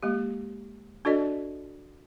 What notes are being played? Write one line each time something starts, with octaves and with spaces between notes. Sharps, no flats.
G#3 A#3 G4
D4 F#4 A4 D5 D#5